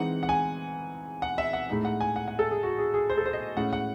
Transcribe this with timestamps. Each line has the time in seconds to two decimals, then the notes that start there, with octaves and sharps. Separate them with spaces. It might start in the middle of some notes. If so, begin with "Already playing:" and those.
Already playing: E3 G#3 C4 D#4 F#5
0.23 F#5
0.29 G#5
1.22 F#5
1.38 E5
1.53 F#5
1.69 A2 G#3 D#4
1.85 F#5
2.01 G#5
2.16 F#5
2.28 F#5
2.39 A4
2.51 G#4
2.63 F#4
2.78 G#4
2.94 G#4
3.10 C5
3.17 A4
3.25 C5
3.33 D#5
3.57 A2 G#3 C#4 F#5
3.73 F#5